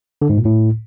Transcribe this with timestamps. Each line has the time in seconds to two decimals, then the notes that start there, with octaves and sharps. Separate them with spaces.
0.22 D3
0.29 G#2
0.37 A#2
0.45 A2